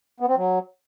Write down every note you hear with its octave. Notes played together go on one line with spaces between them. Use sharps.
B3
C4
F#3